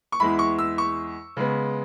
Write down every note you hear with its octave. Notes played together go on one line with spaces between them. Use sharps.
C#6
E2 E3 G#3 E4 B5
C#6
E6
C#6
C#3 G#3 B3